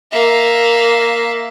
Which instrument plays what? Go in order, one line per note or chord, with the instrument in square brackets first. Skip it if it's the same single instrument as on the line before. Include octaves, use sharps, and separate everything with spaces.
[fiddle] A#3 E5